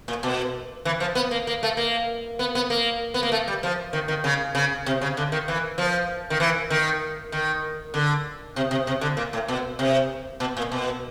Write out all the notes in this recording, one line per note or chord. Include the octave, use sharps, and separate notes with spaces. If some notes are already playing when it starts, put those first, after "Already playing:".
A#2
B2
E3
F3
B3
A#3
A#3
A3
A#3
B3
B3
A#3
B3
A#3
A3
G3
F3
D#3
D#3
C#3
C#3
C3
C#3
D3
D#3
E3
F3
D#3
E3
D#3
D#3
D3
C3
C3
C3
D3
A#2
A2
B2
C3
B2
A#2
B2